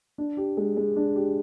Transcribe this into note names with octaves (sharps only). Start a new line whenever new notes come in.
D4
G4
G#3
G#3
D4
G4